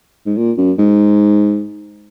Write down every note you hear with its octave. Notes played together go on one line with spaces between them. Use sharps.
G#2
A#2
F#2
G#2